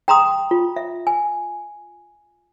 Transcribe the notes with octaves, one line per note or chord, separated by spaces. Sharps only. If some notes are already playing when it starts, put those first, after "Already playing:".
G5 A#5 C6 D#6
F4
E5
G#5